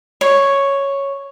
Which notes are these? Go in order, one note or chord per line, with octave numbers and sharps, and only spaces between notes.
C#5